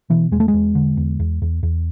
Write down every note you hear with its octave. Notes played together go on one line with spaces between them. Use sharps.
B2 E3
E2 G#3
A3
G#3
E2
D3
E2
E2
E2
E2